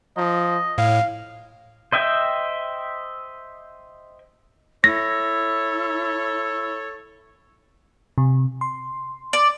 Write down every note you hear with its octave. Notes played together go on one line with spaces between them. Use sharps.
F3 D#5
A2 F5
C5 D#5 E5 G5
E4 A4 C#5 A#6
C3
C6
D5